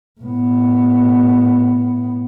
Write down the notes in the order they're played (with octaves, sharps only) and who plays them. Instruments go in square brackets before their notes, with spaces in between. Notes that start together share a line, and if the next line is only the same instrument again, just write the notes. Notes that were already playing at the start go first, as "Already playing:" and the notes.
[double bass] A2 B3